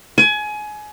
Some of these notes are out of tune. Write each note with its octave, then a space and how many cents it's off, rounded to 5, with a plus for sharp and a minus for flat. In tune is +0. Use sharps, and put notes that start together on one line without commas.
G#5 +25